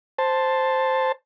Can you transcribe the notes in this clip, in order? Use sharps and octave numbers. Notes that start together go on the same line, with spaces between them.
C5 A5